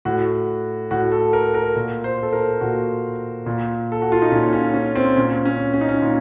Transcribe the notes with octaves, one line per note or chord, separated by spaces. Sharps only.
A2 F#4
A2 F#4
A4
A#4
A#4
A#2
C5
A4
A#4
A#2 F#4
A#2
A4
F#4
F4
D#4
A#2 C#4
C#4
C#4
C4
A#2 C#4
C#4
C#4
D#4
C#4
A#2 D#4